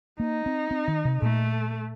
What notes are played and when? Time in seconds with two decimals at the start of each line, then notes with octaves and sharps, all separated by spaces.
0.20 A#3 D#4
0.46 C4
0.71 C4
0.88 D#3
1.05 C3
1.22 A#2 A3